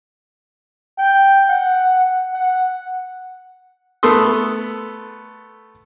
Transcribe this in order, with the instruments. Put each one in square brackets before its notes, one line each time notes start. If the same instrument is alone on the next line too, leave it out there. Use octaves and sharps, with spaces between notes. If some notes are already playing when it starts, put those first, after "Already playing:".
[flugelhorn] G5
F#5
F#5
[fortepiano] A3 B3 A4 C6 D#6